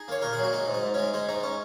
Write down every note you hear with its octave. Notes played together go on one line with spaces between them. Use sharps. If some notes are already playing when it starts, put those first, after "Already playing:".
Already playing: D#4 G#4
A#3 C#5
A#2 A#4
G#4
F#3
F#4
G#3 D#4
G#2
D#4
G#2
G#3 C#4
G#3 D#4
G#2 D#4
C#4